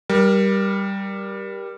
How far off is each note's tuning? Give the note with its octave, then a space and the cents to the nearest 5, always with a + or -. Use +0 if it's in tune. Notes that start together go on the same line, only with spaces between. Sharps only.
G3 +0 A#4 +25